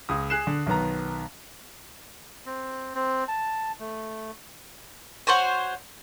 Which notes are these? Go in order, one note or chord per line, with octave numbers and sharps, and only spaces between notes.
C#2 D#6
G#4 F#6 C7 E7
D3
B1 D#3 B3 A#5
C4
C4
A5
A3
F#4 C5 C#5 G#5